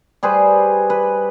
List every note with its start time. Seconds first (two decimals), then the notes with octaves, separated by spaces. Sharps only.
0.23 G3 G#4 B4 C5
0.90 B4